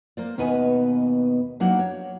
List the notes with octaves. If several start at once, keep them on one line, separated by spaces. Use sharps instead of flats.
A#3 C5 D5
D#2 B2 B3 D#4 B4 G#5
F#3 A#3 D4 D#4 F#4 F#5
C#5